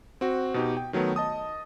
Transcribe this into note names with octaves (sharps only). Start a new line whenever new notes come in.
C4 F#4
B2 D#4 G4
G5
D#3 F#3 A3 B3
D#5 A5 D#6